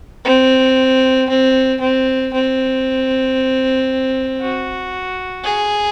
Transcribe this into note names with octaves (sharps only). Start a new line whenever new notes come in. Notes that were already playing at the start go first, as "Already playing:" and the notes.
C4
C4
C4
C4
F#4
G#4